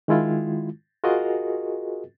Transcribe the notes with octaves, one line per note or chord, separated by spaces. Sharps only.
D#3 G#3 E4 F4
F4 F#4 G#4 A#4 D#5